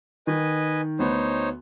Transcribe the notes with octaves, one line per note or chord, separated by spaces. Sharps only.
D#3 B4 D#5 G#5
D2 B3 D#4 C5 C#5